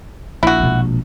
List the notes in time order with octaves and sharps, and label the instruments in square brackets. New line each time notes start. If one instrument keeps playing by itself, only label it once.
[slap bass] A#1 [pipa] E4 F#4
[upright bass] B2 G#3